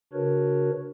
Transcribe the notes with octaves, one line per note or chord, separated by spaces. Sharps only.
C#3 D4 F#4 A#4 B4 C#5